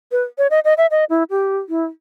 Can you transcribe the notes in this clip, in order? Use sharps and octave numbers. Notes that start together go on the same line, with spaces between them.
B4
C#5
D#5
D#5
E5
D#5
E4
G4
E4